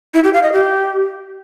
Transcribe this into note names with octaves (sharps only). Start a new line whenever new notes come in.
E4
G4
F5
D#5
G4